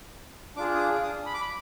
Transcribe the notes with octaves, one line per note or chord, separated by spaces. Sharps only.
D4 F4 G#4 D6
D#6
D6
D#6
B5
D6
B5